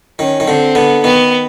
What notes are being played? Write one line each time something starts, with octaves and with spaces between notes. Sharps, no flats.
D#3 C#4
D#3
D3 C4
D3 B3
D#3 B3